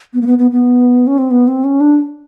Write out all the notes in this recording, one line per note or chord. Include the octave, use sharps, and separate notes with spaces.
B3
A#3
B3
B3
B3
C#4
C4
B3
C4
C#4
D4